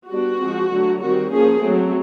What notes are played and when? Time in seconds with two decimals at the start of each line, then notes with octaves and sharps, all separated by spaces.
0.11 G3 B3 D4 F#4
0.41 F3 G#3 C4
0.72 D3 F#3 A3
1.01 D#3 G3 C4 F#4
1.31 F3 A#3 C#4 G#4
1.61 F#3 A3 C4